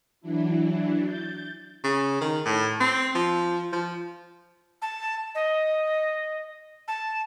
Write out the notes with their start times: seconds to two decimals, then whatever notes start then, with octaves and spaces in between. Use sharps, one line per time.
0.21 E3 F#3 D4 E4
1.01 G6 A6
1.84 C#3
2.21 D#3
2.46 A2
2.81 C4
3.15 F3
3.72 F3
4.82 A5
5.35 D#5
6.88 A5